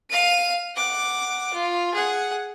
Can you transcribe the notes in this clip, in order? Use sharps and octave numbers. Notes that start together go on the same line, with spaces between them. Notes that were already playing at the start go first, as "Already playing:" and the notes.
F5 D#7
F#5 D6
F4
G#4 F#5